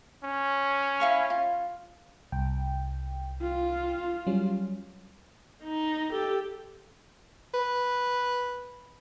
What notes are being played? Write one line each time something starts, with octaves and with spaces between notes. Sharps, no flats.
C#4
E4 F5 C#6
F4
C2 G5
F4
F#3 G3 C#4
D#4
G4 A4
B4